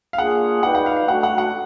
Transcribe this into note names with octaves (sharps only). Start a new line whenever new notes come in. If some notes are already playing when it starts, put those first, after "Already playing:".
F5
A#3 D4 F4 G#4 F#5
D#4 F#4 B4 D5 F#5 G5
F#5
F5
F5
A3 D4 F#4 A4 F#5
F#5
F#5